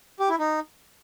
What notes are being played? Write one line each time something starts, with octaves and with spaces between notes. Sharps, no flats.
G4
E4
D#4